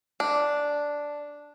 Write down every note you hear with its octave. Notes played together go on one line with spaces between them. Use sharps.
D4